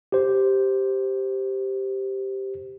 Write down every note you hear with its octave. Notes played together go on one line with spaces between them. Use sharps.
G4 C5